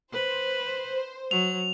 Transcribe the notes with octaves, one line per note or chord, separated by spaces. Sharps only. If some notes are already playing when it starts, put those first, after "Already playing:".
B4 C5
F#3 F7